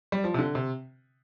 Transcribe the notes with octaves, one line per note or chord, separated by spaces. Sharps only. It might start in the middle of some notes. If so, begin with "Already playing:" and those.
G3
F3
C3
D3
C3